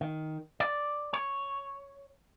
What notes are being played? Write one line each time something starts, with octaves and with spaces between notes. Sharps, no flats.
D#3
D5
C#5